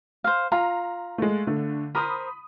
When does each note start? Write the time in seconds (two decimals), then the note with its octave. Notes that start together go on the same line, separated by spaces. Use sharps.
0.24 C5 F5
0.52 F4 A#5
1.18 G#3 A3
1.47 D3 A3
1.95 A#4 C5 B5 D#6